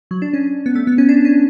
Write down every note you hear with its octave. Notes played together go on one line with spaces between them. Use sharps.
F#3
D4
C#4
B3
A3
B3
C#4
D4
C#4